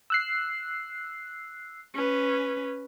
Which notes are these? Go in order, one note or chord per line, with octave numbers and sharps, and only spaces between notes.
E6 F#6 C7
C#4 B4